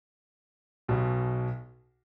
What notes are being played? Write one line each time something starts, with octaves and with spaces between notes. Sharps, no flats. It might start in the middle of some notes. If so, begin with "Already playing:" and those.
B1 B2